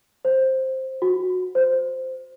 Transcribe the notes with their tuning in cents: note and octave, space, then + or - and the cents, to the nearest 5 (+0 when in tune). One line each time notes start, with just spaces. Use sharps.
C5 +5
F#4 -15
C5 -10